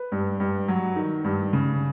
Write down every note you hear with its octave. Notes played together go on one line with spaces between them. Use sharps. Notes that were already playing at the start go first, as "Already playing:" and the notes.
Already playing: B4
G2
G2
F#3
D#3
G2
C#3